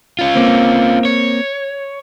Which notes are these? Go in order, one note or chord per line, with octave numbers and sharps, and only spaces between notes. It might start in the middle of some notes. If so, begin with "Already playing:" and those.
C#4 F4
A#3 C4
C#5